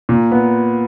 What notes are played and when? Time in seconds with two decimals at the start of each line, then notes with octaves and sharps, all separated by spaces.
0.09 A#2
0.32 B3